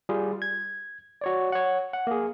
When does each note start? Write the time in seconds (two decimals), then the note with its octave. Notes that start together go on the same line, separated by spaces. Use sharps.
0.09 G3 F4 G#4
0.42 G#6
1.21 F#4 C#5 D5
1.52 C#5 F#5
1.93 F#5
2.07 A#3 G#4